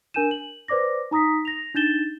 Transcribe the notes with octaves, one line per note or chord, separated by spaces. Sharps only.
D4 A#4 G#5 G6 D#7 E7
F#7
B4 C5 D5 D6 A#6
D#4 A#5 D#6 A#6 B6
A#6 F7
D4 D#4 G6 A6 E7 G7